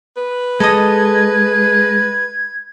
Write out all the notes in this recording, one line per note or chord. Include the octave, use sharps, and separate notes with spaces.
B4
G#3 A4 D#5 G#6